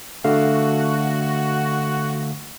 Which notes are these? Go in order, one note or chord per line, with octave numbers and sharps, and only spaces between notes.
D3 A3 F#4 F5